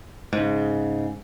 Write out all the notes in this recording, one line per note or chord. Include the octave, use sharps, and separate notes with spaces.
G#2 C#3